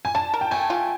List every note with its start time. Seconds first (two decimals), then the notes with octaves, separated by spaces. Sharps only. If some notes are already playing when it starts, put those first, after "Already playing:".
0.05 G#5
0.15 D4 A5
0.34 A#4
0.41 G5
0.51 A3 G#5
0.70 F4